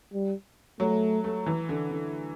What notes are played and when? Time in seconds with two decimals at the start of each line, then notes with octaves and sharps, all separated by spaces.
0.14 G3
0.80 F#3 A3
1.24 A3
1.46 E3
1.69 D3
1.91 D3